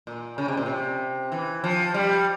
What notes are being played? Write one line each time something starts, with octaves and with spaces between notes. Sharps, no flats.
A#2
C#3
C3
A#2
C3
E3
F3
G3